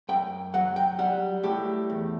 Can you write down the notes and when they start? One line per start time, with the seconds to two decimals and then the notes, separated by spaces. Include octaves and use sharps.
0.09 F#2 G5
0.54 F#3 F#5
0.76 G5
0.99 G3 F#5
1.43 A2 G4
1.90 E2